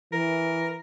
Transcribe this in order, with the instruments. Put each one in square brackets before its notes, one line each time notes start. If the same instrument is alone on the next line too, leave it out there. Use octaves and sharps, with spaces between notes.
[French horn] E3 [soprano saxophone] A#4